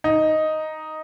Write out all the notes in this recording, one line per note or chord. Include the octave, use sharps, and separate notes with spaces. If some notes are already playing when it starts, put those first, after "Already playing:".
D#4